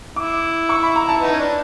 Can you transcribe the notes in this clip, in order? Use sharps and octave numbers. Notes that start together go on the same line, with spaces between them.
E4 D6
C#6
B5
A#5
A5
B3 D#4
C#4
D4